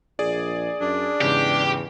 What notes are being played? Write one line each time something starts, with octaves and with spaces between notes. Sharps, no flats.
A#1 G#4 D5
F#2 D4
E2 G#2 C#3 G4